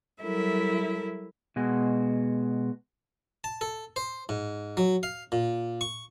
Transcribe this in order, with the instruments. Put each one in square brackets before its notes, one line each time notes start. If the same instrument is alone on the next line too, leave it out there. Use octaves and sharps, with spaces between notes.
[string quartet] F#3 G3 E4 A4 A#4 E5
[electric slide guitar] B2 G#3 F#4
[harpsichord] A5
A4
C5
G#2
F#3
F5
A#2
C#6